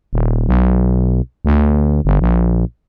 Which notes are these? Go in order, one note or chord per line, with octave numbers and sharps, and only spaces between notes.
D#1
B1
D2
G1
A#1